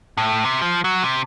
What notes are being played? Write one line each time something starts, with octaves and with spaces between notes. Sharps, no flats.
A2
C3
F3
F#3
C3